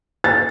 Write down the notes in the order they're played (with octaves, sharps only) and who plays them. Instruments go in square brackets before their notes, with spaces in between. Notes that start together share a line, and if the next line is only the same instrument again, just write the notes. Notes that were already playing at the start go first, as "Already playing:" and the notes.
[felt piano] A6